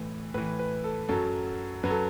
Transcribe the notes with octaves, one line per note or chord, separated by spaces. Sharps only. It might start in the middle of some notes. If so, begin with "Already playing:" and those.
Already playing: A2 E3
A2 E3 B4
B4
A4
F#2 F#3 A4
F#2 F#3 B4
A4